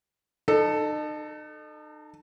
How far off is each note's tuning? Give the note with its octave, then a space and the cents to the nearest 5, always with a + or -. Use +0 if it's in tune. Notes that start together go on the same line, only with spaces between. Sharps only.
D#4 -40 A4 +0